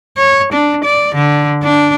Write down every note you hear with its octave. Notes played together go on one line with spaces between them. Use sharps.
C#5
D4
D5
D3
D4